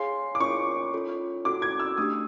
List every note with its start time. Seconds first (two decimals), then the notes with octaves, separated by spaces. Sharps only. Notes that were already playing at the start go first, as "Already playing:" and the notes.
Already playing: G#4 C#5 F5 G#5 C6
0.35 D6
0.40 C#4 F4 A#4 C#5 C#6
0.93 C#4 F4 A4 C#5
1.45 C#4 F#4 A4 D6
1.62 G#6
1.80 E6
1.98 A3 D4 G4 D#6